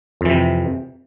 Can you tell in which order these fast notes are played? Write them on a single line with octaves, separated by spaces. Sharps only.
F2 E3 C3